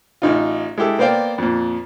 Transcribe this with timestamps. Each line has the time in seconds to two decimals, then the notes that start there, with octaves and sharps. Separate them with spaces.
0.22 A1 D#4 F4
0.78 G#3 E4 G4 A4
0.99 A#3 B3 C5 D5 F5 G5
1.38 F2 A#2